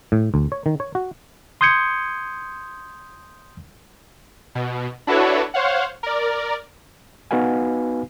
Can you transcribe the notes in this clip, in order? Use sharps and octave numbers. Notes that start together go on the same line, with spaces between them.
A2
D2
C#5
D#3
C#5
F#4
C6 D#6 G6 G#6 C#7
B2
D4 E4 F#4 A4 B4 C#5
C5 C#5 F5 F#5
A#4 D5
B3 D#4 F#4 B4 F5 G#5